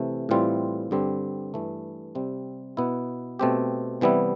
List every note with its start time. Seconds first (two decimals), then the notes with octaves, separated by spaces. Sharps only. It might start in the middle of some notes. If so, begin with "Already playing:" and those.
Already playing: C3 E3 A3
0.29 A2 E3 G3 C4 F4
0.91 G2 D3 G3 C4 G4
1.54 G2 E3 A3
2.15 C3 G3 C4
2.77 B2 B3 E4
3.39 B2 A3 C4 G4
4.01 C3 E3 G3 B3 E4